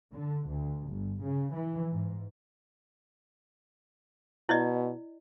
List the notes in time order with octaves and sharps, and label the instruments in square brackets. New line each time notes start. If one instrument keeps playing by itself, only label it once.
[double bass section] D3
D2
G1
C#3
E3
G#2
[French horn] B2 [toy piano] E4 D5 D#5